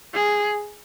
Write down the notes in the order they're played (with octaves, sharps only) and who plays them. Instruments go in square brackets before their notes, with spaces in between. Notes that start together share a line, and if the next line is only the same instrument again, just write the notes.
[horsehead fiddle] G#4